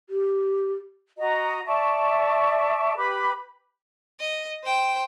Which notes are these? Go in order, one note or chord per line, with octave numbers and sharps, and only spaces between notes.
G4
F#4 D#5 A#5
D5 E5 A5 C#6
G4 B4 B5 D6
D#5
C5 G5